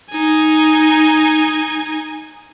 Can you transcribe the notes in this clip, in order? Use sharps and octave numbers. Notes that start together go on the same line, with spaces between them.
D#4 G#5